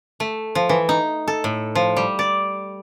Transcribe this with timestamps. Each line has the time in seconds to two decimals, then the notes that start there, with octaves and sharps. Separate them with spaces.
0.20 A3
0.55 F3
0.69 E3
0.89 D#4
1.28 A4
1.44 A2
1.75 F3
1.97 G3
2.19 D5